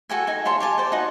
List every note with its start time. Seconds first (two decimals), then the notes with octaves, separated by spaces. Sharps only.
0.10 F#4 A4 G5 G#5
0.27 D#4 G#5
0.45 F4 C#5 A5 C6
0.60 G4 G#5 A5
0.78 C5 D5
0.92 D#4 F#4